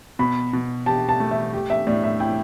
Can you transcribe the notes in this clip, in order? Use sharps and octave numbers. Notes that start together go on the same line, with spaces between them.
B2 B5
B2
G4 A5
A5
A3
E5
G4
E5
A2 D5
E5
E4 G5